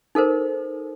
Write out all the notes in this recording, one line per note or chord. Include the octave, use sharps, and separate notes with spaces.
D#4 A4 A#4 C5